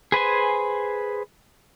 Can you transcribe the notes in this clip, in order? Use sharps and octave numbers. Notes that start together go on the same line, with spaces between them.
G#4 B4 C5 G#5